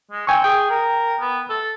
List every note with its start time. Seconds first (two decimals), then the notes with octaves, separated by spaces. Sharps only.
0.11 G#3
0.27 C4 G5 G#5 C#6
0.44 G#4 G5
0.70 A#4
1.20 B3
1.49 A4